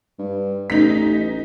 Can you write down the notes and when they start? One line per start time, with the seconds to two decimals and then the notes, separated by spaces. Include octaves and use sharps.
0.19 G2
0.70 A1 D#4 B6